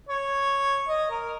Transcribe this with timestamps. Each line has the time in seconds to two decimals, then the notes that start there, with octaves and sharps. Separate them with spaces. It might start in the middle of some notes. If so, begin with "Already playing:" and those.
0.09 C#5
0.88 D#5
1.10 A#4